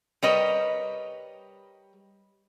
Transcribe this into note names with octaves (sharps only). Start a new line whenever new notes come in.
G3 A#4 B4 C#5 D#5